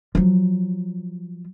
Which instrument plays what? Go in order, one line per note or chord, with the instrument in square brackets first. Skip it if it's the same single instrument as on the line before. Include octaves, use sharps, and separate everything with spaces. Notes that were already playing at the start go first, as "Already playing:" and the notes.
[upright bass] F3 F#3